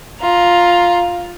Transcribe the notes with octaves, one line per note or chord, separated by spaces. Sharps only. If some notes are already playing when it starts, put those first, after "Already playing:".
F4 A#5